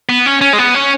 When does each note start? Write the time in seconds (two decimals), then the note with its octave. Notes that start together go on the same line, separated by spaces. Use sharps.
0.09 B3
0.26 C#4
0.41 C#4
0.53 G#3
0.58 B3
0.75 C#4